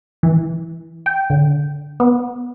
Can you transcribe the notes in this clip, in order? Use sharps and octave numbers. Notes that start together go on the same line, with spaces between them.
E3
G5
D3
B3